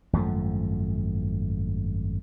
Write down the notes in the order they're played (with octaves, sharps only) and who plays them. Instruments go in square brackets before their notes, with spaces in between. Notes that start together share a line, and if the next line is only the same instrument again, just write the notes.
[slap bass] G#1 F#2 F3 A3